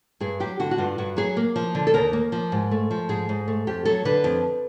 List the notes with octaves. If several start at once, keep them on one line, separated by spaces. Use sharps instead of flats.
G2 G#4
F#3 G4
D3 F#4
F#4
G2 F4
G2 F#4
F#3 G#4
A#3
F3
D3
A4
D#2 A#4
A#3
F3
G#2
A3
F3
G#2 G#4
G#2
A3
F2 G4
F#3 A4
D3 B4
F2